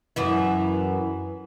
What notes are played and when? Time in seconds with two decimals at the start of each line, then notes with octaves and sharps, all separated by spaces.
0.16 F#2 E3 E4